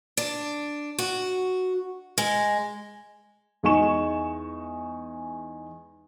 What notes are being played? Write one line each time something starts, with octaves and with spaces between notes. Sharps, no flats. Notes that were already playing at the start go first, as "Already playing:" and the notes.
D4
F#4
G#3
E2 G#3 D#4 G#5 C#6 E7